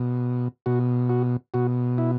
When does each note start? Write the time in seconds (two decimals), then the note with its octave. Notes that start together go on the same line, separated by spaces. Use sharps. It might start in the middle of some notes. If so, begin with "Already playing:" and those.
Already playing: B2
0.66 B2 F#4
1.10 F#4
1.54 B2 F#4
1.98 E4